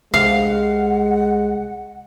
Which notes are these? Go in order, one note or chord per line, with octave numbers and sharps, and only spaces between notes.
C2 G#3 F5 F#5